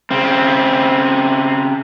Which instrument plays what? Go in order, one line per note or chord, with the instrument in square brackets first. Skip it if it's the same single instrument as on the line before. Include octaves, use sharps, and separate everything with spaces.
[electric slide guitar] C#3 C4